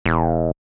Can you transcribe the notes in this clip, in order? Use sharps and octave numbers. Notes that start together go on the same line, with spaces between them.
E1